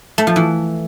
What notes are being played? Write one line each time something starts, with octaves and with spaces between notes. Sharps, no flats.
A3
F3
E3